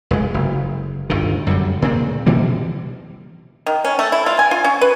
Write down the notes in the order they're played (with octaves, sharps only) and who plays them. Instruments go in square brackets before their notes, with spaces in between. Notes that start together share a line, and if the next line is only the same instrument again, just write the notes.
[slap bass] F1 G#3
F#1
G1 D2 D#3
F#2 D3 G3
A#2 C#3 C4
B2 E3 G3 A#3
[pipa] D#3
C#4
A3
E4
F4
G#5
F4
C#4
B4